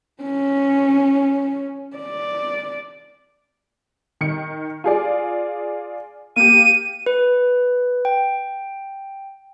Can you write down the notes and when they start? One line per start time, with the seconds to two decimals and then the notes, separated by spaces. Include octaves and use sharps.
0.23 C#4
1.97 D5
4.21 D#3 C#7
4.84 F4 G#4 D5
6.36 A#3 G4 D#7
7.06 B4
8.05 G5